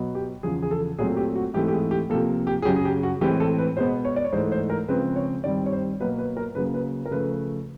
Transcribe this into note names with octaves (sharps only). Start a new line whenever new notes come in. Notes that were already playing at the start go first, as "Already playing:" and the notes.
Already playing: B2 F#3 B3
G4
E2 C#3 F3 G#4
G#4
A4
A#2 F#3 A3 C4 G#4
G4
F#4
G#2 E3 A3 C4 G4
G4
G#4
G4
C3 F3 A#3 A4
G4
G#4
F#2 C#3 F#3 G4
G#4
G4
F#4
A2 E3 G#3 C4 G4
A4
B4
B2 G#3 B3 C5
C#5
D5
C#5
G#2 E3 A3 C5
C5
A#4
C#3 F3 G#3 C4 B4
C#5
G2 D#3 G3 C4 D5
C#5
C5
B2 F#3 A#3 B4
B4
A#4
C#3 F#3 A#3 B4
B4
A#4
C#3 F3 A3 B4